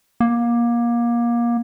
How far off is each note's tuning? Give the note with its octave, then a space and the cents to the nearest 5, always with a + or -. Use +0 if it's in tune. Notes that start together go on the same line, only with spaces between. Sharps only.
A#3 +25